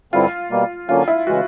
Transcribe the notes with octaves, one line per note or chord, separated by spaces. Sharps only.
G2 D3 G3 C4 E4 F4
B2 G3 A#3
D3 F#3 A#3 C#4 F4
E4
C#3 E3 G#3 F#4